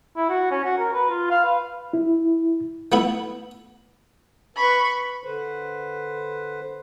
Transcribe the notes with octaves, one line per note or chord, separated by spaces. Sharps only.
E4
F#4
C#4
F#4
A#4
B4
F4
F5
B4
E4
A3 B3 E4
B4 B5 C#6
D3 B4 C5